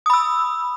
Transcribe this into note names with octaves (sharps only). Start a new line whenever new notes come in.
B5 D#6 E6